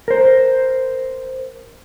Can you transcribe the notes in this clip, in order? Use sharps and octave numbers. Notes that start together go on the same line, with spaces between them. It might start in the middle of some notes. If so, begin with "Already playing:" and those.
A#4 C5